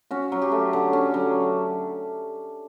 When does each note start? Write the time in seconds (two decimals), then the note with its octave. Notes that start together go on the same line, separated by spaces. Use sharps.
0.11 C#4 F#4
0.32 F#3
0.42 G4
0.52 A3
0.73 D3
0.93 C#4
1.14 F#3